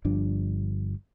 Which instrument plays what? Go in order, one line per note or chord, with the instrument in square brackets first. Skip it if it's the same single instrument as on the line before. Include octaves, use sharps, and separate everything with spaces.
[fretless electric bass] G1 G2 F3 D4